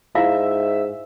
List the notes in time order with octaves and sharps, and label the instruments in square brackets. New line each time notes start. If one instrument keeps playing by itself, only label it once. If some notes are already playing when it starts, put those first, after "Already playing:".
[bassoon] G#2 [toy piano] E4 F4 F5 [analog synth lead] E5